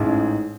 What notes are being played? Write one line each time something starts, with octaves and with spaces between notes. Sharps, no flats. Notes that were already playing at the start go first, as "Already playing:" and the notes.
Already playing: A1 G#2 G#3 C#4